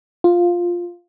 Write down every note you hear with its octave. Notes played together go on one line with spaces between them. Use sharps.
F4